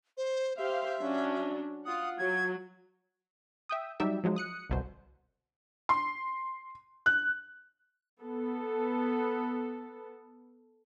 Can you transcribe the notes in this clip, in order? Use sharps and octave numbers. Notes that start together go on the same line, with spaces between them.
C5
G4 C5 E5 F5
F#3 C#4 D4
F4 F#5 D#6
F#3 G#6
E5 G5 D#6
F#3 G3 D#4 G4 E5
F3 F#3 G#3 D#4
D#6 F#6 C#7
G1 C2 B2 C5
C6
F#6
B3 A4